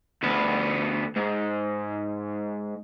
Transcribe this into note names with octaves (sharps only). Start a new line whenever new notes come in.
D2 B3
G#2